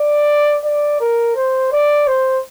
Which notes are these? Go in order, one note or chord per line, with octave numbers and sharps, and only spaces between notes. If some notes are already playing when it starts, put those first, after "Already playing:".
Already playing: D5
D5
A#4
C5
D5
C5